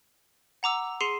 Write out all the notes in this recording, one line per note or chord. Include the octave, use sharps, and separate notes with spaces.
F#5 A#5 D6 E6
G#4 C6 C7 C#7 D#7 E7